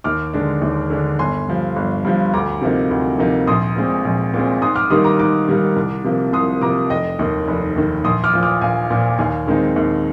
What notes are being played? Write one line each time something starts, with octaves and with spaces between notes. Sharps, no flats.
D#2 D6 F6
D3 G#3 D4
D#2
D3 G#3 D4
G1 G#5 C6
G2 F3
G1
G2 F3
D2 A#5 D6
C3 F3 A#3 D#4
D2
C3 F3 A#3 D#4
A#1 C6 D#6
A#2 G#3 C4
A#1
A#2 G#3 C4
G#2 C6 D#6
D6 F6
D#3 G3 A#3 D#4 C6 D#6
A#5 D6
G#2 A#5 D6
D#3 G3 A#3 D#4
C2
C3 F3 A#3
C2 C6 D#6
C3 F3 A#3 A#5 D6
F1 D#5 G5
D#2 D#3
F1
D#2 D#3
A#1 C6 D#6
D6 F6
A#2 F3
D6 F6
A#1 F5 G#5
A#2 F3
D#2 F5 G#5
D#3 G#3 C4 D#4
D#2